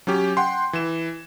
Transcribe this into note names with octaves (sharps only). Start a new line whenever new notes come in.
F#3 C#4 G4
F#5 G5 C6
E3 E7